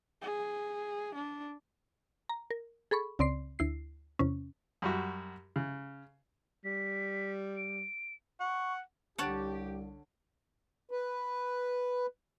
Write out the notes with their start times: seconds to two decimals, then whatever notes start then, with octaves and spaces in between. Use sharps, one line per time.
0.22 G#4
1.15 D4
2.29 A#5
2.51 A#4
2.91 G#4 A4 B5 C#6
3.19 C#2 C#3 C4 D5 C6 C7
3.59 D2 E4 C7
4.19 E2 C3 C#4
4.82 F#2 G3 F#4
5.56 C#3
6.65 G3 B6
7.57 D7
8.40 F#5 C#6
9.18 C2 D3 G4 C#5 F#5 A5 D7
10.91 B4